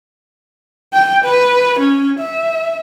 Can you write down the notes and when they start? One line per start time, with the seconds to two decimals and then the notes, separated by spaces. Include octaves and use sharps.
0.93 G5
1.24 B4
1.79 C#4
2.20 E5